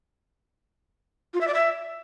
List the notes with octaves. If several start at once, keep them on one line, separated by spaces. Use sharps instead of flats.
F4
E5
D5
E5